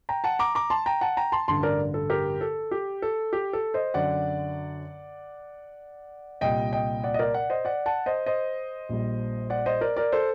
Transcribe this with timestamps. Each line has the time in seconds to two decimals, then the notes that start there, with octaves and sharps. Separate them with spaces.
0.09 G5 A#5
0.24 F#5 A5
0.39 A#5 D6
0.55 A#5 D6
0.70 A5 C6
0.86 G5 A#5
1.01 F#5 A5
1.17 G5 A#5
1.32 A5 C6
1.48 A1 G2 D3 A5 C6
1.63 A#4 D5
1.94 A4
2.10 G4 A#4
2.41 A4
2.71 G4
3.02 A4
3.33 G4
3.53 A4
3.74 C5 D#5
3.94 F#2 D3 F#3 D5 F#5
6.41 C2 A#2 G3 D#5 G5
6.73 D#5 G5
7.04 D5 F#5
7.14 D#5
7.19 A#4 D5
7.34 D5 F#5
7.50 C5 D#5
7.65 D5 F#5
7.86 F#5 A5
8.06 C5 D#5
8.26 C5 D#5
8.89 A#1 A#2 G3
9.50 D5 F#5
9.66 C5 D#5
9.81 A#4 D5
9.96 A#4 D5
10.12 A4 C5